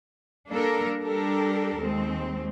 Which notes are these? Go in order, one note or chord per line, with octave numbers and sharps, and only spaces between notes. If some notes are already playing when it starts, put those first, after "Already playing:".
G3 A#3 D4 A4 A#4
G3 D4 G4 A4 A#4
D#2 G#3 C4